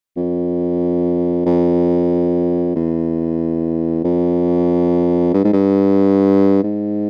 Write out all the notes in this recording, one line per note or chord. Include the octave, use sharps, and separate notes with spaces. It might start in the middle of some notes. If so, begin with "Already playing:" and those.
F2
F2
E2
F2
G2
G#2
G2
G#2